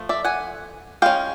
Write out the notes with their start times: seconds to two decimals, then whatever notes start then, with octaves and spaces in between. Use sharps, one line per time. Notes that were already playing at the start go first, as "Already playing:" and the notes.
Already playing: F3 A3
0.09 D5 E5
0.24 F#5 G#5
1.02 G#3 C#4 F5 G5